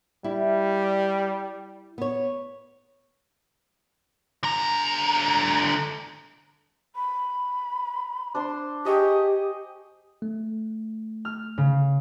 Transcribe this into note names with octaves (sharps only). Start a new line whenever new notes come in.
G3 E4
B3 C#5
D3 A#5
B5
D4 C5 C6
G4 G#4 D#5 C#6
A3
F6
C#3